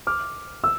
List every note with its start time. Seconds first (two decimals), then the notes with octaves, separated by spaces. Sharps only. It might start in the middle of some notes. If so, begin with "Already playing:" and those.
0.07 D6 F6
0.64 E6